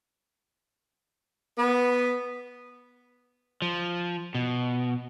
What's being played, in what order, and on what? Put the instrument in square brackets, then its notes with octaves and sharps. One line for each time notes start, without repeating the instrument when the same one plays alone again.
[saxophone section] B3
[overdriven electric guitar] F3
B2